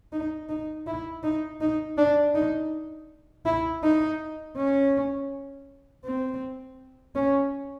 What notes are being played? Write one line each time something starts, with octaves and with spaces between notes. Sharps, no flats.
D#4
D#4
E4
D#4
D#4
D4
D#4
E4
D#4
C#4
C4
C#4